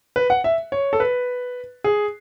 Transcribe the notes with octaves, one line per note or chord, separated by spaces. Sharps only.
B4
F#5
E5
C#5
A4
B4
G#4